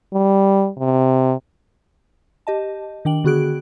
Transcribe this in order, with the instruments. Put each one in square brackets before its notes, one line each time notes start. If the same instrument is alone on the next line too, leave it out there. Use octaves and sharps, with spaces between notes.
[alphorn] G3
C3
[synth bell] G4 D#5 A5
D#3 D4 G5 F#7
D3 B3 F#4 G#4 F#6 D7